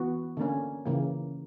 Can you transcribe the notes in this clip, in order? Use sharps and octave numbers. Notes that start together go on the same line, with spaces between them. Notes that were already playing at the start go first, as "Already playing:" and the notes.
Already playing: E3 B3 F#4
D3 A#3 C#4
C#3 E3 A#3